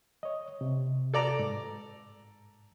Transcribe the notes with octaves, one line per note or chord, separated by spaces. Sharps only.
C#5 D#5
C3
A4 D5 A#5
G#2